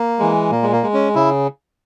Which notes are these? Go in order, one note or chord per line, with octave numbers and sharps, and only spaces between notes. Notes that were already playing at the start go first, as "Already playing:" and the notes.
Already playing: A#3
E3 G#3
A#2 A#3
G#3
A#3
G#3
C#4
C#3 E4